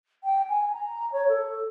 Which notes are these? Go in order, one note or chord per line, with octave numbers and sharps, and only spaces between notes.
G5
G#5
A#5
C#5
A4